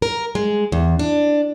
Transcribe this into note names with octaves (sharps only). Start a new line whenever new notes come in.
A#4
G#3
E2
D4